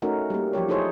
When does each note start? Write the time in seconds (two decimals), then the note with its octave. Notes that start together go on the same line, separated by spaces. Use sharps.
0.02 A3 C#4 D#4 F#4 A#4
0.30 G3 A#3
0.53 F3 F#3 G4 C#5
0.69 D#4 E4 G#4 A4 C5 C#5